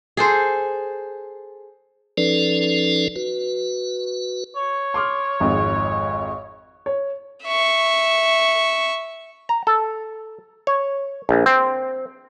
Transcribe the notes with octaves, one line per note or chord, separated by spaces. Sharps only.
G#4 A4 C5
F3 C#4 D#4 A4 B4 D5
F#4 B4
C#5
C6 D6 F6
G#1 F2 G#2
C#5
E5 C#6
A#5
A4
C#5
A#1
C4